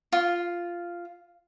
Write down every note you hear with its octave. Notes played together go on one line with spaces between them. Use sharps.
F4